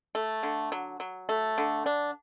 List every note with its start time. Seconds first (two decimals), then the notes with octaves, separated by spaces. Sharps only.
0.15 A3
0.43 D3
0.72 F#3
1.00 F#3
1.29 A3
1.58 D3
1.86 D4